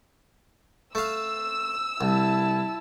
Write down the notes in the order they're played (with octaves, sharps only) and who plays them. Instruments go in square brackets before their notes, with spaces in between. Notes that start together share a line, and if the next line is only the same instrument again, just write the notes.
[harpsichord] A3 F5 [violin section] E6
[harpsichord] C2 [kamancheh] E4 A5